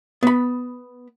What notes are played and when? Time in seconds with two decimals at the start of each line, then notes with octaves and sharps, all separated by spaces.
0.23 B3 B5